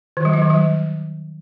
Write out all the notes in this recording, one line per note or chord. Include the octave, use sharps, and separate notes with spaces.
D#3
G3
F#3
D#3
G3